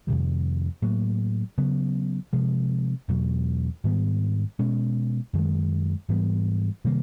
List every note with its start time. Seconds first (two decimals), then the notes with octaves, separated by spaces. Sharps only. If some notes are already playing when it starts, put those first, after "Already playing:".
0.07 F2 C3 D#3 G3
0.82 A2 F#3 A#3
1.58 C#3 F#3 B3
2.33 C3 F3 G#3
3.08 E2 B2 F#3
3.84 G#2 D#3 G3 B3
4.59 B2 G#3 C#4
5.33 F#2 D#3 G#3
6.09 G#2 E3 G3 B3
6.84 C3 D#3 G3 A#3